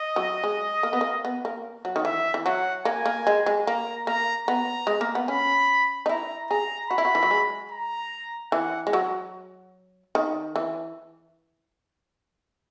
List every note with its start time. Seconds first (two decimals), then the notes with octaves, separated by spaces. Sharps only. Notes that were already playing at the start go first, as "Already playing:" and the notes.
Already playing: D#5
0.16 F#3
0.44 G#3
0.83 A#3
0.93 B3
1.01 A#3
1.25 B3
1.45 A#3
1.85 F#3
1.96 D#3
2.05 E3 E5
2.34 E3
2.46 F#3 F#5
2.85 A#3 G#5
3.06 A#3
3.27 G#3
3.46 G#3
3.67 A#3 A#5
4.07 A#3 A#5
4.47 B3 A#5
4.87 G#3
5.01 A#3
5.15 B3
5.28 C#4 B5
6.06 D#4
6.09 E4 A#5
6.50 G#4 A#5
6.90 F#4 B5
6.98 E4
7.05 F#4
7.15 E3
7.23 F#3
7.31 G#3
7.72 A#5
8.52 E3 F#5
8.87 G#3
8.93 F#3
10.15 D#3
10.56 E3